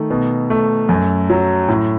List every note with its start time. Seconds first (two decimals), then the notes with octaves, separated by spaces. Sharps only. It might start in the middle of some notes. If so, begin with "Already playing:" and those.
Already playing: D#3 A3
0.10 B2
0.50 A3
0.89 F#2
1.30 F#3
1.69 A2